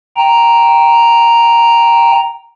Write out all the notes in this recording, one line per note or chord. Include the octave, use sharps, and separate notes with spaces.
G5 A#5